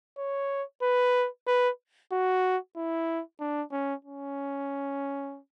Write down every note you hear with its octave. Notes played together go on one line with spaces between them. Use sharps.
C#5
B4
B4
F#4
E4
D4
C#4
C#4